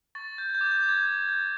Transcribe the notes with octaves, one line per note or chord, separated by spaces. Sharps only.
C#6 A6
G6
G#6
G6
D6
G6
D6
G#6
G6
G6